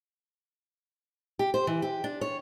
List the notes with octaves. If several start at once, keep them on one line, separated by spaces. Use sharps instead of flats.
G4
C5
E3
G4
D4
C#5